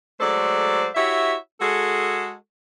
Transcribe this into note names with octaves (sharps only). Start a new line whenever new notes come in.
F#3 G#3 A3 A4 C5 D5
E4 F#4 G4 C#5 E5
G#3 F#4 G#4 A4